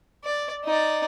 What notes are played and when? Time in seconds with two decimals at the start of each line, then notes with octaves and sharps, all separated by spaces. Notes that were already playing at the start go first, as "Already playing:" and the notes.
0.24 D5
0.65 D#4 D5